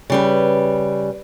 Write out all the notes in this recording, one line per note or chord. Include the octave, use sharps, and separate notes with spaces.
C#3 G3 B4